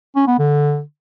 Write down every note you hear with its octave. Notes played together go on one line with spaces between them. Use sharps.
C#4
B3
D3